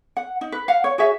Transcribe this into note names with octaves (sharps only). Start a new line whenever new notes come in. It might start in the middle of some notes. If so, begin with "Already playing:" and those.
F#5
D#4
B4
F5 F#5
C#5
F#4 G#4 C#5 E5